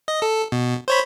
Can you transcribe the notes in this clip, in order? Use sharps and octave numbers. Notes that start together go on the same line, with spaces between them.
D#5
A4
B2
C5 C#5 B5